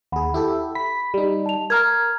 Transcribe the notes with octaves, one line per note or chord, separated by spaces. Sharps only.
D#2 G#4 F#5 B5
E4 G4 A4
B5 B6
G3 D#4
A5 F7
A#4 A#5 F6 G#6